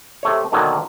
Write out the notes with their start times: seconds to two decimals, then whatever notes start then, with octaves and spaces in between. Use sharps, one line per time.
0.23 C3 A3 C#5
0.52 B2 D3 D#3 F#3 A#3